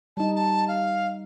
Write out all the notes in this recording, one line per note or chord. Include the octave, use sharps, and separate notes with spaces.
G3 D#4 A5
A5
F5